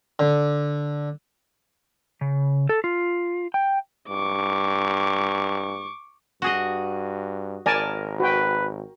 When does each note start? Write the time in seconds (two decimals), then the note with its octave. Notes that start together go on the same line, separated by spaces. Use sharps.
0.19 D3
2.21 C#3
2.69 A4
2.84 F4
3.54 G5
4.09 G2 C#6 D6
6.42 G2 F#4 G#4 D#5
7.66 G#1 A#4 D5 G#5 A5
8.20 F#4 B4 G5